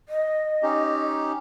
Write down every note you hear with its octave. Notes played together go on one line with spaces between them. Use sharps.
D#5
C#4 D#4 G4